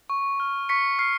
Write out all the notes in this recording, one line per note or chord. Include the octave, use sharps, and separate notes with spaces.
C#6
F6
C#6 B6 C#7
F6 C7